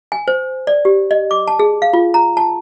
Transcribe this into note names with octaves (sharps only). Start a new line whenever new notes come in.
G#5
C5
D5
G4
D#5
D6
A5
G#4
F5
F4
A#5
A5